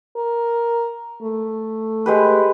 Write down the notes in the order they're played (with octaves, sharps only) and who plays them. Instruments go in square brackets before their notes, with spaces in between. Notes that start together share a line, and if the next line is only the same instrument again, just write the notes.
[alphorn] A#4
A3
[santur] G#3 G4 B4